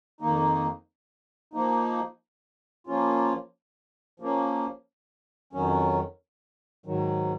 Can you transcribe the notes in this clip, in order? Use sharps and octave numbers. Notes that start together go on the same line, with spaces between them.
F2 D#3 A#3 D#4
F3 A#3 D#4
F3 A#3 C#4 F4
F3 A#3 C#4
F2 D#3 F#3 C#4
G#2 D#3 F#3